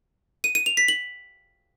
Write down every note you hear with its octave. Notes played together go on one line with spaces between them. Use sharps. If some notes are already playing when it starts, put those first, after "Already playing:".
D#7
D#7
F7
B6
F#7